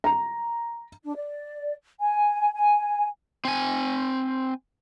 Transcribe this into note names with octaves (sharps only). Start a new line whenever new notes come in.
A#5
D4
D5
G#5
G#5
C4 G#5